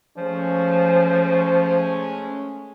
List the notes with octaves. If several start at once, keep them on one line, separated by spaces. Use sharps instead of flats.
F3 G#3 A3 C#4